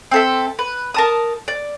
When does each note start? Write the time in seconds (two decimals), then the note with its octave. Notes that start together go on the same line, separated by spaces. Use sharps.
0.11 C4 A4 E5
0.59 B4
0.94 A#4 A5 D#6
1.48 D5